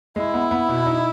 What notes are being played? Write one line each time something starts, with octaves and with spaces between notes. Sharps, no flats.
G#3 E4
B3
B3
B2
D#4